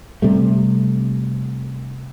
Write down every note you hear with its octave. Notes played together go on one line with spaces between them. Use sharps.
C3 G3 A3